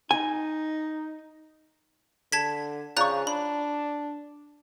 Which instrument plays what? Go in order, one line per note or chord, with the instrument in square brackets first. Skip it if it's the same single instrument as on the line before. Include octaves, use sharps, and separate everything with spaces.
[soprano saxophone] D#4 [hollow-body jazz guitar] G#5
[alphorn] D3 [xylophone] A5 G#6 B6
[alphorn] C#3 [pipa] F3 C#6 [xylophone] D5 A#5 F#6
[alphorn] D4 [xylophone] B5